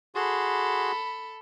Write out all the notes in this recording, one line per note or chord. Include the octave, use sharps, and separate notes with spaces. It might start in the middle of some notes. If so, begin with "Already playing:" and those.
F#4 G#4 A4 B5 C6